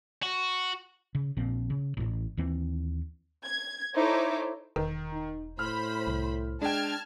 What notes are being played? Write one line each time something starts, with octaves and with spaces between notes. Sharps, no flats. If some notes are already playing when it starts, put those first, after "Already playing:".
F#4
C#3
A#1 A#2 F3 C4
C#3
A1 A2
D#2 E3 C4
G#6
D#4 E4 A4 C5 C#5 D6
E1 D#3
D#4
A2 C5 B5 F6
C2
G#3 D4 G5 A5 F6 G#6